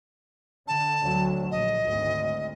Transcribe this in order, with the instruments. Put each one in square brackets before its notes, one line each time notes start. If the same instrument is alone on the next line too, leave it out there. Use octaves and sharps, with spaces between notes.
[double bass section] D3 [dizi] A5
[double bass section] D2 D3 F#3
[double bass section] A#1 [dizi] D#5
[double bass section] G#1 D2